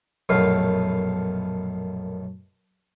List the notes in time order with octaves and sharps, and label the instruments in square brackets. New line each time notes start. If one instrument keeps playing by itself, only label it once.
[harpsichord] A#1 F#2 B2 A3 B3 F5